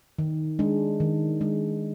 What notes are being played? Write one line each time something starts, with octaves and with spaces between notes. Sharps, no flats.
D#3
G#3 D4
D#3
G#3 D4